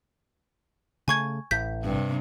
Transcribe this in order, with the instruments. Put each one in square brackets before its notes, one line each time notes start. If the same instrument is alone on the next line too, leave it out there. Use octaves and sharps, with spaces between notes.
[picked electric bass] C#3 A3 [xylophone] G#5 C#6 G#6
[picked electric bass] A1 A2 [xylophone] G6 B6
[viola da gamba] G2 C3